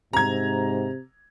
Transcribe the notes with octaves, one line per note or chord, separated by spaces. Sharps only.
G#2 C3 A#5 G#6